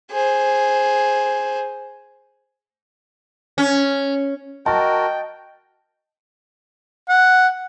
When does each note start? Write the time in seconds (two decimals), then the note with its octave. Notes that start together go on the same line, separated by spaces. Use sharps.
0.11 G#4 C5
3.58 C#4
4.66 F#4 A#4 D#5 G5 A5
7.09 F#5